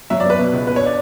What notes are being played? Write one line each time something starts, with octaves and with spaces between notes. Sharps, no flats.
F#3 E5
D5
B3 B4
B2
C#2
B3 B4
C#5
D4 D5